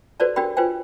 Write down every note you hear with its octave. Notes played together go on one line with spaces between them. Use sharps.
F#4 A4 B4 C5 D5 A5
D4 F#4 G4 A#4 G5 B5
F4 B4 C5 G5 G#5